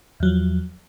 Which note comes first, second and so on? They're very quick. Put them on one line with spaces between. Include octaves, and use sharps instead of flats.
E2 F#3 F3